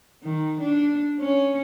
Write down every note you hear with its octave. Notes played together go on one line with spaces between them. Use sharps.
D#3
D4
C#4